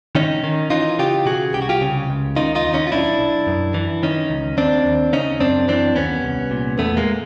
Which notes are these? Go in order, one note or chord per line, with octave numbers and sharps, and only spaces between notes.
D#3 C#4 D#4
D#3
E3 D#4 F4
C#3 F4 G4
B2 F#4 G#4
C2 G4
F#4
F4 G4
C#3
C#2
D#3 D#4 F4
D#4 F4
D#2
C#4 D#4
F4
B1 D4 E4
B1
F#2
E3
D#3 C#4 D#4
C#2
D#2 C4 D4
D#2
C#3 C#4 D#4
F#2 C4 D4
E3 C4 D4
D#2 B3 C#4
C2
A#2
E2 A3 B3
G#3 A#3